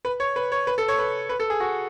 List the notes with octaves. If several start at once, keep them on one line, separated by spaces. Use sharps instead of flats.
B4
C#5
B4
C#5
B4
A4
C#5
B4
B4
A4
G#4
F#4